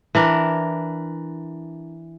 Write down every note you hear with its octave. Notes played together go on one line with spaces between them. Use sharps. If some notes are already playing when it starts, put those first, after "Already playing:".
E3 D4 A#4